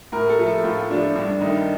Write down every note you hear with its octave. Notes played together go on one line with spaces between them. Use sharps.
A2 A#4
A4
F3 A3
A4
A2 F4
F3 A3 D4
G2 D4
D#3 A3 D#4